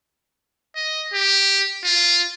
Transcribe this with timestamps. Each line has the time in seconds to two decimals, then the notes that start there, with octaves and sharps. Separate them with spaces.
0.76 D#5
1.14 G4
1.85 F4